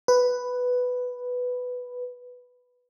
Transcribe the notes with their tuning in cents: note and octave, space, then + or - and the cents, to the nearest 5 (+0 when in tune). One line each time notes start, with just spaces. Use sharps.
B4 +5